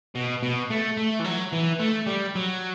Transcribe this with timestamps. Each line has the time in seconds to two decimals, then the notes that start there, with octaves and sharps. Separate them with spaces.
0.15 B2
0.43 B2
0.70 A3
0.97 A3
1.19 E3
1.24 F#3
1.53 E3
1.80 A3
2.07 G3
2.35 F#3